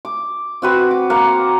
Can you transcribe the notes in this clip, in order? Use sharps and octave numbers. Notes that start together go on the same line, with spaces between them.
D6
C4 F#4 B4
D6
A#3 F#5